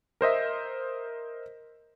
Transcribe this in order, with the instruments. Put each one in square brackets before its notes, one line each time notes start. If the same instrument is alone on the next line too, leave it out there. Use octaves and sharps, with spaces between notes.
[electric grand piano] A#4 C5 D#5 E5